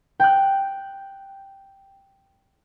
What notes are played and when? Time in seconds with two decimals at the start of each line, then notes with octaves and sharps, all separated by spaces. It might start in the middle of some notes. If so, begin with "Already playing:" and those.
0.20 G5 F#6